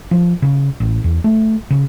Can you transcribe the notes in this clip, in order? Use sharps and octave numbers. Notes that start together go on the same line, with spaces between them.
F3
C#3
A1
E2
A3
C#3